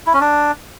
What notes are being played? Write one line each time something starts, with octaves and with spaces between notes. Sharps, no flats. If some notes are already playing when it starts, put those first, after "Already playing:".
E4
C#4
D4